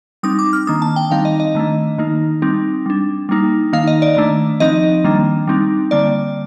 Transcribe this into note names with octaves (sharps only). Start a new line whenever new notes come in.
G3 C4 D#4 D#6
D6
F6
D#3 A#3 D4 D#6
A5
G5
D#3 G3 C4 D#4 F5
D#5
D#5
D#3 A3 D4
D#3 A#3 D#4
G3 C4 D#4
G3 D4
G3 A#3 D#4
D#3 A#3 D#4 F5
D#5
D5
D#3 A3 D4
F3 C4 D#4 D#5
D#3 G3 A#3 D4
G3 C4 D#4
D3 G3 A#3 D5